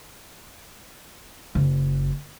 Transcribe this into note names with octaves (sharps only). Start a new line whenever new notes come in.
F#1